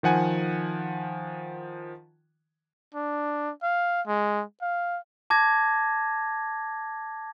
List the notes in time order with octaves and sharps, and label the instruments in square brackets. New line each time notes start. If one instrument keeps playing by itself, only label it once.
[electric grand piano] D#3 F3 F#5 G#5
[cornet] D4
F5
G#3
F5
[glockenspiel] A5 D6 G#6 A#6